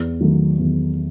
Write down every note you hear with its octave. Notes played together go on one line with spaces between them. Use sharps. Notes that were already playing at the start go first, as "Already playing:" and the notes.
Already playing: E2
D#3 F#3 A3
E2